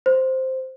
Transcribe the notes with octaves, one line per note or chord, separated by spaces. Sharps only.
C5